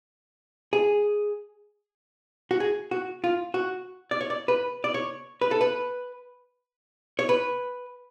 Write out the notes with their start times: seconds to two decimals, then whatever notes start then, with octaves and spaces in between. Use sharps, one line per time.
0.73 G#4
2.51 F#4
2.60 G#4
2.91 F#4
3.24 F4
3.54 F#4
4.11 D5
4.21 C#5
4.30 D5
4.48 B4
4.84 D5
4.94 C#5
5.41 B4
5.51 A4
5.61 B4
7.19 C#5
7.29 B4